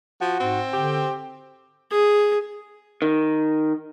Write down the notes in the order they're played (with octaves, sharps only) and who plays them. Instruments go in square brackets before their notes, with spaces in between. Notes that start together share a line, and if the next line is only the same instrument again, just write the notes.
[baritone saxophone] F3 [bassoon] F#4
[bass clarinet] G#2 [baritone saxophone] C4
[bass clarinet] D3 [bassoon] G4
[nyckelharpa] G#4
[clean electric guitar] D#3